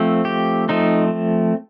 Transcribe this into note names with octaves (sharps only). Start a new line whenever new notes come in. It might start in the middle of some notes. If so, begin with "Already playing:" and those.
Already playing: F3 A3 C4
G4
F3 A3 C4 D#4